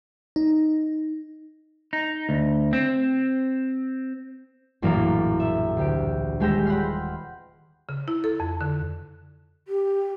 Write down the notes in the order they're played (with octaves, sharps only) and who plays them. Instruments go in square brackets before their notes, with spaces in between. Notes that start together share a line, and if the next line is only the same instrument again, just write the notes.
[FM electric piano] D#4
[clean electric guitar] D#4
D2
C4
[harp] A#1 F#2 A2 E3 A#3 F5
E5
D2 G4 D7
D#1 G#3 G4 G5 E6 A#6
F#5 G5 B5 C6 F6
[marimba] C#3
E4
A4
F2
D3
[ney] G4